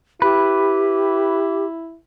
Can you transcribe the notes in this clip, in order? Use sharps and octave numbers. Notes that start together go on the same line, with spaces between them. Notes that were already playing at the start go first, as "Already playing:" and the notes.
E4 G4 B4